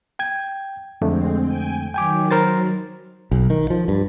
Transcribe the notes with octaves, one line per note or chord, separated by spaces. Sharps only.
G5 G#6
F2 D3 G#3 A3 C4
G5 G#5
D#3 F#3 G5 G#5 D6
A#4 C5 A6
B1
D#3
F3
G2